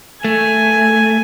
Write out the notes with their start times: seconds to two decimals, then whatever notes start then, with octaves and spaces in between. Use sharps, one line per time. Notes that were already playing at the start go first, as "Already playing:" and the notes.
0.24 A3 G#5